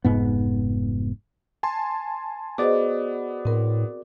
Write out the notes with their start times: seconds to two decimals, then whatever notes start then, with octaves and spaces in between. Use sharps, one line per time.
0.04 F1 G#2 B3
1.63 G#5 A5 C6
2.58 B3 F#4 G#4 C5 D5 D#5 D6
3.45 A2 C4 A#4